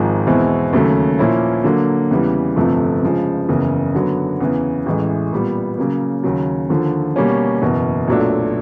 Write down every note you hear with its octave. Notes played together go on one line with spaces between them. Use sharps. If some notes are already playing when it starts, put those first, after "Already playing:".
Already playing: G#1 G#2 F3 G#3
E2 B2 G#3 C4 E4
D#2 C#3 F#3 A3
A#2 F3 A#3 C#4 E4
D3 F#3 A#3
E2 C#3 E3 G3
G1 F2 C3 F3 A3
C#3 F3 G#3
F#1 E2 C#3
D3 F#3 B3
E2 C#3 E3
A1 A2 E3 G#3
A#2 G3 B3
C#3 F#3 A#3
D#2 C#3 F#3
D#2 D3 F3
B2 G3 A#3 C#4
F#1 E2 B2
B1 A#2 F#3 A3 D4